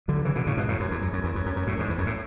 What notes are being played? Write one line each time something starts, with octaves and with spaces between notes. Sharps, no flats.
D3 F#3
C#3 E3
B2 D3
A2 C#3
G#2 B2
F#2 A2
F#2
E2
F#2
F#2
E2
F#2
F#2
F#2
F#2 A2
E2 G#2
E2
F#2
A2